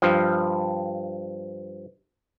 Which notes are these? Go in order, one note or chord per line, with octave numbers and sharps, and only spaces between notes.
G2 F3